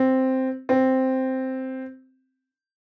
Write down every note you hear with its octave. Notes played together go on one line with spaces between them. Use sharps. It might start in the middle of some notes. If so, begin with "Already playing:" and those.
Already playing: C4
C4